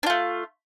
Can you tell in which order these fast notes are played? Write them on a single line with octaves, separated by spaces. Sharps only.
D4 F4 A3